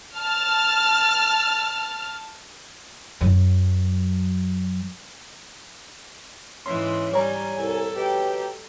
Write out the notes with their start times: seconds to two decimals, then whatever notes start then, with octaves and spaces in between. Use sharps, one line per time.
0.17 A5 F6
3.21 F#2 F#3
6.66 G#2 E3 C#4 C6
7.14 G3 C#5 G#5 A#5
7.58 C2 A4
7.95 B2 G4 G5